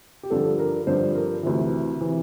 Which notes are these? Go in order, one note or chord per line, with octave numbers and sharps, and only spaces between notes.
G4
G2 D3 F3 A4
A#4
G2 D3 F3 C5
A#4
D2 C3 E3
C3 E3